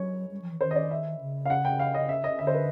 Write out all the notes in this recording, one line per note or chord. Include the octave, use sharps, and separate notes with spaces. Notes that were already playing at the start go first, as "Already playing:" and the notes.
Already playing: F#3 C#5
G3
F3
E3
D#3 C5
D#5
D5
E5
C#3
F5
F#5
G5
F5
D#5
E5
D#5
D3 E5
C5
B4